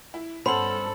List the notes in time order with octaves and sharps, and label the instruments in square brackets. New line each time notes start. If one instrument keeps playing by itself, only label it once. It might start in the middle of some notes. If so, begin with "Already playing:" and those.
[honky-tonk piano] E4
[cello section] G2 A4 [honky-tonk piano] B3 C#4 [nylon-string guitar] C5 [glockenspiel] B5 F#7